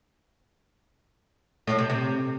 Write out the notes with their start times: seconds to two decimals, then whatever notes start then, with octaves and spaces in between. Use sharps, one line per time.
1.67 A2
1.78 C3
1.90 C3